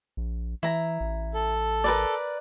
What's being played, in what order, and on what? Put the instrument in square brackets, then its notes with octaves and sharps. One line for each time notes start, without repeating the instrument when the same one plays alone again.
[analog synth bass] A#1
[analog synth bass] E3 [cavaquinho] E4 A#5
[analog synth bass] A1
[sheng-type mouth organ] A4
[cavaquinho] A#4 B4 D5